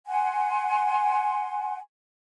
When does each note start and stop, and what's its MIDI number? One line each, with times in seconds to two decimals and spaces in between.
0.07 1.79 78
0.07 1.79 80
0.07 1.79 84